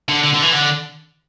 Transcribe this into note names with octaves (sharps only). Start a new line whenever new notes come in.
D3
D3
D3
E3
D3